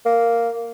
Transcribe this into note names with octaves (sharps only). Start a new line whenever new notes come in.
A#3